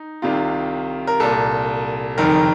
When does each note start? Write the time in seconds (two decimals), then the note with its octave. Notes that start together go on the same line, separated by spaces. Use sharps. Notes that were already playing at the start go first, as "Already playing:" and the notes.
Already playing: D#4
0.22 C2 C3 D#3 F4
1.07 A#4
1.20 C2 A#2 A4
2.18 F#1 F2 D#3 A#4